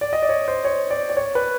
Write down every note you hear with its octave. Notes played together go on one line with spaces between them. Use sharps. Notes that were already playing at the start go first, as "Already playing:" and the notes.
D5
D#5
D5
C#5
C5
C#5
D5
D5
C#5
B4